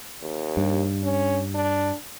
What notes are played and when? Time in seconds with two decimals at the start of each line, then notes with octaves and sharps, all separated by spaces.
0.22 D#2
0.57 G2
1.04 C#4
1.55 D4